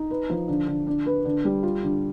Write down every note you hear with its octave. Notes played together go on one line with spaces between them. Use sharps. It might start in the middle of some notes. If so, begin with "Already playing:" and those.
Already playing: D#4
B4
F3
D3
D3
D4
B4
D3
G3
F4
D3